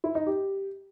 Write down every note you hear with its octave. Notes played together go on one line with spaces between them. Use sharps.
E4
D#4
G4